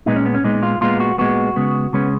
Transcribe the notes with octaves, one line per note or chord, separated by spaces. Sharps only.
A#2 G#3 B3 D#4
C#4
B3
C#4
A#2 G#3 B3 D#4
F4
A#2 G#3 B3 F4
F#4
A#2 G#3 B3 F#4
C#3 G#3 B3
C#3 G#3 B3 C#4